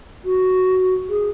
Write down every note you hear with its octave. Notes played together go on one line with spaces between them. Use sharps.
F#4
G#4